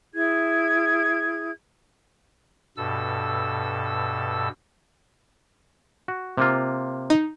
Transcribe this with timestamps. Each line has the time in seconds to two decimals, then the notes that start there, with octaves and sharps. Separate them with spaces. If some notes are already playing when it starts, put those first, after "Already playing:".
0.13 E4 G#4 G#6
2.77 G2 B2 A4 E6
6.08 F#4
6.38 C3 A#3 F4
7.10 D#4